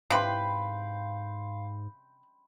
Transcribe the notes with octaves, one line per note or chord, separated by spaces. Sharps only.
G#2 C3 B4 F5 G5 B5 C6